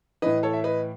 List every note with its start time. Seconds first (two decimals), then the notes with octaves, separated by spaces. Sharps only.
0.22 A2 E3 B4 D#5
0.43 A4 C#5
0.53 E5
0.64 B4 D#5